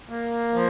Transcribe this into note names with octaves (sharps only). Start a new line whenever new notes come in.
A#3
F3